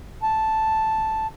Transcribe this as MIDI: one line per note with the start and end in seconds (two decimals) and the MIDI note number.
0.23 1.27 81